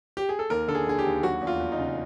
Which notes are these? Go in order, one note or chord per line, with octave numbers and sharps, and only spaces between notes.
G4
G#4
A4
D#2 A#4
D3 A4
G#4
D3 G#4
G4
D#2
F#3 F#4
E2
F4
E2
D#4
C#3